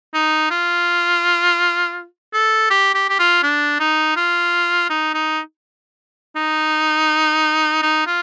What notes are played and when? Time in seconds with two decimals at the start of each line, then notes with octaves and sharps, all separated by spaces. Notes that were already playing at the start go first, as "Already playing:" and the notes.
0.14 D#4
0.51 F4
2.34 A4
2.70 G4
2.94 G4
3.10 G4
3.19 F4
3.43 D4
3.80 D#4
4.16 F4
4.90 D#4
5.14 D#4
6.36 D#4
7.82 D#4
8.07 F4